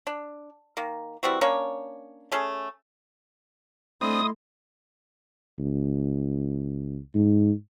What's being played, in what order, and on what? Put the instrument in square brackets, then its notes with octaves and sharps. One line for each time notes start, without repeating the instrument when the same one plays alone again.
[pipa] D4
D#3 A#3
E3 G3 C4 F#4
A#3 C#4 D4 C#5
A3 C#4 G#4 A4
[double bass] A3 [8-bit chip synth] C4 D4 [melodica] E4 D#5 C6 [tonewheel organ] D#6
[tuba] C#2
G#2